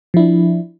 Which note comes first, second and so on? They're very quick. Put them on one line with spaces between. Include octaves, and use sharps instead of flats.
F3 E4 D4